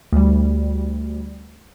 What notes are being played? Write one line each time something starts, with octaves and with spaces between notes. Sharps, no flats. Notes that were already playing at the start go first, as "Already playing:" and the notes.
D2 G3